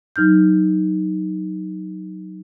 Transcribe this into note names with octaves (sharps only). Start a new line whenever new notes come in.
F#3 D#4 F6 G6